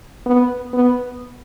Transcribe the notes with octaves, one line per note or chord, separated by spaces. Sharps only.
B3
B3